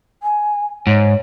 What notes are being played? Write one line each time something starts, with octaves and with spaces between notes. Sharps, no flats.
G#5
G#2 C#5